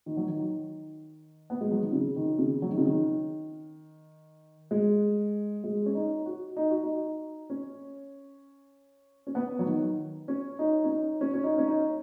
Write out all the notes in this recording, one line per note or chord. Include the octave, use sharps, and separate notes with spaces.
D#3
F#3
D#3
B3
G#3
F#3
D#3
C#3
D#3
C#3
F#3
D#3
C#3
D#3
G#3
G#3
C#4
D#4
F#4
D#4
F#4
D#4
C#4
C#4
B3
F#3
D#3
C#4
D#4
C#4
D#4
C#4
C#4
D#4
C#4
D#4